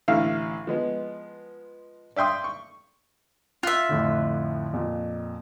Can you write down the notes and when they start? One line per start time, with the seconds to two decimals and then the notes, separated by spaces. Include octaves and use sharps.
0.08 A1 D3 E4 F5
0.67 F3 G#3 B3
2.16 D5 E5 G5 C6 D#6
2.44 C#6
3.63 F4 E5 F#6
3.89 F2 A2 D3
4.73 F2 A#2